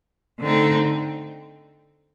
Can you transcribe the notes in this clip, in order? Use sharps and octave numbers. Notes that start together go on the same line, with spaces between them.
D3 A3 C4 D#4